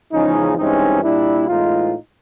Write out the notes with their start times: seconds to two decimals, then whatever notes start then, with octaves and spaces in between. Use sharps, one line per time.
0.12 E2 C#3 F3 G#3 C#4 D#4
0.57 G2 E3 G#3 C4 C#4 D#4
1.02 A#2 G3 A#3 D4 E4
1.47 A2 E3 G#3 B3 D#4 F4